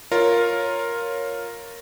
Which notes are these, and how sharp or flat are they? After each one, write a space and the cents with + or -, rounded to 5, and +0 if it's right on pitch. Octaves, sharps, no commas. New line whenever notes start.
F4 +10 A#4 +0 C#5 +0